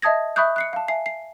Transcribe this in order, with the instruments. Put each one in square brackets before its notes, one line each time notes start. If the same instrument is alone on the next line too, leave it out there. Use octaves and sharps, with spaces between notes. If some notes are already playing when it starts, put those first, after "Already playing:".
[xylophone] D#5 E5 A5 D#6 G#6 A#6
E5 B5 C#6 D#6 F#6 G6
F#6 C7 C#7
F5 A5
E5 G#5 C7
C7